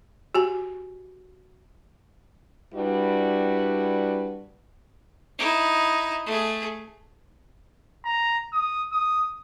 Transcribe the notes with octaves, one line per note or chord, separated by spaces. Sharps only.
F#4 G4 G#5
G3 D4 E4 F#4 B4
D#4 E4
A3 G#4
A#5
D#6
D#6